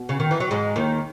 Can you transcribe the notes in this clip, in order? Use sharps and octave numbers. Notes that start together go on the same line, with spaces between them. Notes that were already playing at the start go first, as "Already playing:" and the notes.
Already playing: B2
C#3
D#3
E3
F#3
G#2 G#3
D#2 D#3